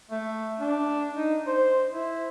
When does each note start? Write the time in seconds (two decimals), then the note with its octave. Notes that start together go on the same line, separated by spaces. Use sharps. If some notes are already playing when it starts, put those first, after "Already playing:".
0.11 A3
0.60 D4
1.16 D#4
1.47 C5
1.92 E4